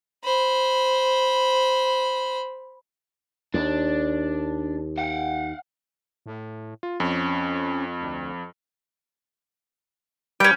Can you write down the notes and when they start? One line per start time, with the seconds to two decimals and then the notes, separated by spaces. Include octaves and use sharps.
0.24 C5 B5
3.54 D#2 D4
4.98 F5 F#5
6.26 A2
6.83 F4
7.00 F2 C#4
8.01 D2
10.40 G3 C#4 G5